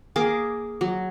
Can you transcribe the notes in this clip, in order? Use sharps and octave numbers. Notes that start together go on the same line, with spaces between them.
A#3 G#4 D6
F#3